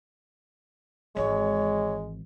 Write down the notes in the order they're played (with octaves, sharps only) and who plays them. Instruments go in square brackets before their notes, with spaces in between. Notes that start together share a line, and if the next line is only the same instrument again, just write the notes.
[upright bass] G#1 E3 [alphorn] G#3 [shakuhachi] C#5